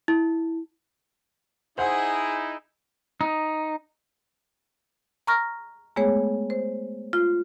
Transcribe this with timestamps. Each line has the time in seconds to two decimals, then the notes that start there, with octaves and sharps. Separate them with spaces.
0.08 E4
1.78 D#4 E4 G#4 C5 F#5
3.21 D#4
5.27 A#5 C#6 F6 A#6
5.96 G#3 A3 B3 G#4 C#5
6.50 C5
7.13 F4